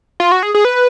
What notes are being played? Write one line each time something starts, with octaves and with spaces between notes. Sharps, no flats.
F4
F#4
G#4
G#4
B4